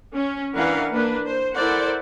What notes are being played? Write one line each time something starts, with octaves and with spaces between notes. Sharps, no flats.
C#4
E3 D4 A#4 B4 F5 F#5
A#3 D4 B4
C5
E4 A4 A#4 C5 D5 F#5